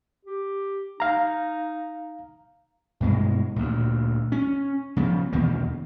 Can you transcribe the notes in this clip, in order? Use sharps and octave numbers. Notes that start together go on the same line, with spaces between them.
G4
D#4 F5 A#5
G2 B2 G#3
D2 A#2
C#4
C#3 F3 B3
E2 B2 D#3 A#3